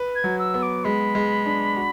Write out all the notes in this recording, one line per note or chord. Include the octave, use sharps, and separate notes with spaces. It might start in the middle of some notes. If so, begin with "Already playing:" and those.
Already playing: B4
G#6
F#3
E6
B3
D6
G#3 B5
G#3
D4
F#4